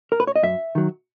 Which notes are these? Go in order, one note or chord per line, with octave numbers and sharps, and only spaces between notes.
A#4
B4
C#5
D#5
F#2 E5
D#3 F#3